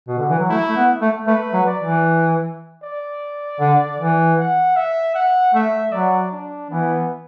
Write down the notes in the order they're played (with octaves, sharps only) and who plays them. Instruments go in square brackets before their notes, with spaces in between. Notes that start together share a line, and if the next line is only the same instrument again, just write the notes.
[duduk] B2
D3
E3
F#3
[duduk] A3 [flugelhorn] E4
[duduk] A3
B3
A3
[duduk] A3 [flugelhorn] B4
[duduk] F#3
[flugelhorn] D5
[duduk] E3
[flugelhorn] D5
[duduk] D3
E3
[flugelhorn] F#5
E5
F#5
[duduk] A3 [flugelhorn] E5
[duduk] F#3 [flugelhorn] D5
[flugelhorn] D4
[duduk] E3 [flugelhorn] B3